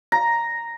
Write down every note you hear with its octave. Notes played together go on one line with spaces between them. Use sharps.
A#5